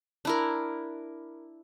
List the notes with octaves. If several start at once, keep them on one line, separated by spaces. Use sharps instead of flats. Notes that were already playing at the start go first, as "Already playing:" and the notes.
D4 E4 A#4